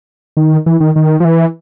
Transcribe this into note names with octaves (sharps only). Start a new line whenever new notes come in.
D#3
E3
D#3
D#3
F3
E3